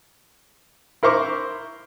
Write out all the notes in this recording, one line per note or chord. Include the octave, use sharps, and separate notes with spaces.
E4 A#4 C5 C#6 D6